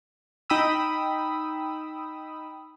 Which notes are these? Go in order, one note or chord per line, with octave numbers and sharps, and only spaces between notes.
D#4 G5 B5 D#6 E6